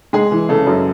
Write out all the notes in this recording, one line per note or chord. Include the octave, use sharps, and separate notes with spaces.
G#3 G#4
E3
C#3 A4
F#2